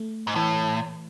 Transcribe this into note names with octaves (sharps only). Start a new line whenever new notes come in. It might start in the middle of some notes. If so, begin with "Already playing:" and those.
Already playing: A3
G#2
A2 E3